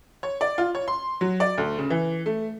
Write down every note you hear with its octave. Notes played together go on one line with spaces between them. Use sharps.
C#5
D5
F4
C#5
C6
F#3
D5
D2
C#3
E3
A3